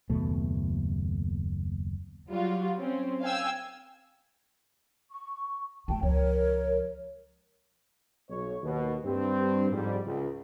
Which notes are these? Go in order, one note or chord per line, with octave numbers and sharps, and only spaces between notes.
F#1 D#2 B2 A3
F#3 G3 F4 F#4
C4 C#4
F5 G5 G#5 E6
C#6
G#3 A#3 G5 A5
C#2 F3 A#4 C#5
B1 C#5
D#2 B2
G2 C4
F2 G#2 G3
C#2